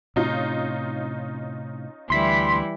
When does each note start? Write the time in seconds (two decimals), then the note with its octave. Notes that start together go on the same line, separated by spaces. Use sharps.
0.16 A2 C3 C#4 D#4 F4
2.10 D2 E3 G3 E4 C6 B6